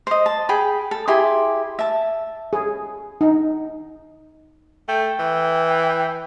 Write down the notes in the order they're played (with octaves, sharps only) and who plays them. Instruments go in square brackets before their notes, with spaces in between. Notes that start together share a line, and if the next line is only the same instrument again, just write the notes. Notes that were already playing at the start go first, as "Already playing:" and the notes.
[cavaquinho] C5 D#5
A5
G#4 G5 B5
A4
E4 G4 G#4 C6
E5 A5
[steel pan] G#4
D#4
[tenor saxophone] A3 [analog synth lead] G5
[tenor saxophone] E3